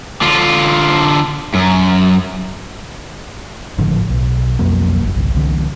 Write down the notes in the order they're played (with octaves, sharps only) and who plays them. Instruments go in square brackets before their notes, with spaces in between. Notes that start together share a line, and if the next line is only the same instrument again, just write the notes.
[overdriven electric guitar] D3 F4
F#2
[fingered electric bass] G#1 A2 D3 F3
B1
B1 F2 F#3 A#3
F#1
G#1 C#2
C2 D3 E3